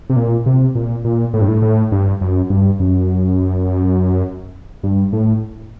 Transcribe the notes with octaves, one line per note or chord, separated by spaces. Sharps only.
C3
A#2
C3
A#2
A#2
A2
G2
A2
A2
G2
F#2
G2
F#2
G2
A2